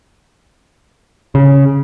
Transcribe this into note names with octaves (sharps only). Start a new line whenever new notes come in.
C#3